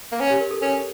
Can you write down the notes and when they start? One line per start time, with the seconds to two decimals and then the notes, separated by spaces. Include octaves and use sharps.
0.12 A#3
0.20 C#4
0.30 G4
0.40 A#4
0.51 A4
0.62 C#4 A#4